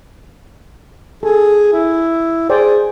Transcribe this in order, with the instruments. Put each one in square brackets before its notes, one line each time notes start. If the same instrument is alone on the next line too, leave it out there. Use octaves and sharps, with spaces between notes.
[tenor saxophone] G#4 [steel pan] A4
[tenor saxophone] E4
[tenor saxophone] G#4 [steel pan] C5 D5 G5